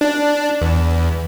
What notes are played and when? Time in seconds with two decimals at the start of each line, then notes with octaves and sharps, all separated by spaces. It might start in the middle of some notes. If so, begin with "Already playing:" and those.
0.01 D4
0.62 E2